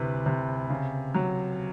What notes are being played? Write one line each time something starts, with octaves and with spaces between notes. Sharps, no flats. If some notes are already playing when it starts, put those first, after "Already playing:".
Already playing: D2 C3 E3 B4
C3
C#3
F#3